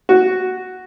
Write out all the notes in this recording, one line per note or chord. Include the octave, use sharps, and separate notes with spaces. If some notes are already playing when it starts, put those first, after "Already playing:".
F#4